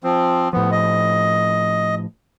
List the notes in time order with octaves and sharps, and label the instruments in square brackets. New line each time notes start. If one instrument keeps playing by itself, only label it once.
[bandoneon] F3 C4
[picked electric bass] A2 F3 [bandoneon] B3
[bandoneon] D#5